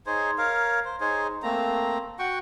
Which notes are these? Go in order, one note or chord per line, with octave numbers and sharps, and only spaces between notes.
D#4 G#4 C5 C#5
A#4 C#5 F5
C5
D#4 G#4 C5 C#5
A3 A#3 C4 A#5
F#4 F#5 G5 C#6